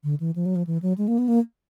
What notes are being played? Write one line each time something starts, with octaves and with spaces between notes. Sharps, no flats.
D3
E3
F3
F#3
F3
E3
F#3
G#3
A#3
B3
A#3